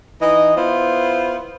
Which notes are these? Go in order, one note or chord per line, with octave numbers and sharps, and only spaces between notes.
E3 D#4 D#5
B3 E4 F4 C5